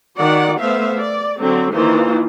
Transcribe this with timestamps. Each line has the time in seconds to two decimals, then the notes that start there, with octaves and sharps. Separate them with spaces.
0.17 D#3 F#4 D5 F#5
0.60 A3 B3 C5 E5 F5
1.00 D5
1.40 D3 F#3 C4
1.74 D#3 E3 A#3 F4 C5